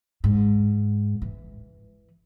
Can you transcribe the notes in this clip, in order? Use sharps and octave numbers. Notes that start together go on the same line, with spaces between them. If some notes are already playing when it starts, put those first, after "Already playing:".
G#2
E3